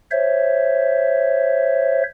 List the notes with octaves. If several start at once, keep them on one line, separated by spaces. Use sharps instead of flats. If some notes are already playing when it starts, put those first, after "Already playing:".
C5 C#5 E5